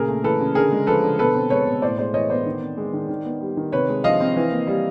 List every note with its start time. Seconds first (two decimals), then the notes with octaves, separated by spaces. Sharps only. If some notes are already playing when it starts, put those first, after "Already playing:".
Already playing: A#2 C#3 G#4 A#4
0.08 A3
0.23 E3 A4 B4
0.40 C#3
0.55 D3 G#4 A#4
0.72 G#3
0.87 F3 A4 B4
1.03 D3
1.19 B2 A4 B4
1.35 C4
1.50 G#3 B4 C#5
1.67 B2
1.82 A2 C5 D5
1.98 G#3 C5 D5
2.14 E3 C#5 D#5
2.30 B3 C5 D5
2.46 D#3
2.62 C4
2.77 G#3
2.93 D#3
3.09 D#3
3.25 B3
3.41 G3
3.57 D#3
3.72 C3 B4 C#5
3.89 G#3
4.04 F3 D#5 F5
4.20 C4
4.36 E3
4.52 A#3
4.67 G3